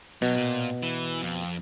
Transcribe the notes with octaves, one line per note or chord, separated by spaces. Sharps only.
B2 F#3
A#2
E3
F2